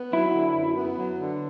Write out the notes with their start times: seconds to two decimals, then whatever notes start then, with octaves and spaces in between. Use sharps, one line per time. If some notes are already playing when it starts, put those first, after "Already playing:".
Already playing: B3
0.13 F#3 E4
0.34 D3
0.55 F#2
0.77 B3
0.98 F#3
1.18 D3